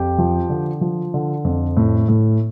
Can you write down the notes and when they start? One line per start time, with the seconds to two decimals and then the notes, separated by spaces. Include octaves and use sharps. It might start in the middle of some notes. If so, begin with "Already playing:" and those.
Already playing: F2 G4 G5
0.18 F3
0.49 D3
0.81 F3
1.14 D3
1.44 F2
1.77 A2
2.08 A2